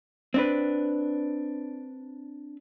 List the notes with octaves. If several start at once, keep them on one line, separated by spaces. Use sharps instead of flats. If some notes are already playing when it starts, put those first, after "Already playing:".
C4 D4 B4